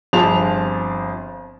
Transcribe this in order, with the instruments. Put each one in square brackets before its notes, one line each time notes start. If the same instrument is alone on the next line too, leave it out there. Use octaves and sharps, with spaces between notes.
[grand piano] G1 F3 C4 G#4 A5 F7